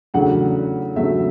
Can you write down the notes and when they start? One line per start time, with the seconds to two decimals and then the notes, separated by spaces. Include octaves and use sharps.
0.14 E2 C#3 F#3 A3 D4 F#5
0.95 E2 C#3 F#3 A3 D4 E5